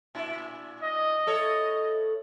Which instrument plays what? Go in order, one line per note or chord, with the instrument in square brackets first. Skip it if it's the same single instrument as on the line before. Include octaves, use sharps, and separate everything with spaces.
[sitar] A#2 D4 E4
[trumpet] D#5
[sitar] A2 A4 C#5